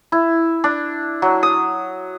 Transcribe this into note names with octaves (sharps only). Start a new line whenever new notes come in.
E4
D4
F#3
D#6